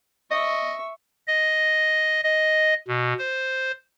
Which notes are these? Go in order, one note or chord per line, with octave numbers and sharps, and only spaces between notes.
D#5 E5 C#6
D#5
D#5
B2
C5